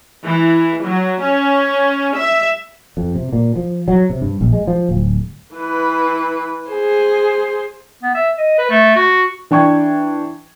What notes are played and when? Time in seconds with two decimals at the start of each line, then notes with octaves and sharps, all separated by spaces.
0.24 E3
0.85 F#3
1.21 C#4
2.17 E5
2.97 F2
3.15 C3
3.33 A#2
3.56 F3
3.88 F#3
4.10 C3
4.21 G2
4.41 A#1
4.53 G#3
4.67 F3
4.89 D1
5.55 E3 B4
6.70 G#4 C5
8.03 B3
8.15 E5
8.38 D#5
8.58 B4
8.70 A3
8.95 F#4
9.51 E3 D4 G5 C#6 G#6